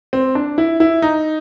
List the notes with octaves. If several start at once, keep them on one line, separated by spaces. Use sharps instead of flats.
C4
D4
E4
E4
D#4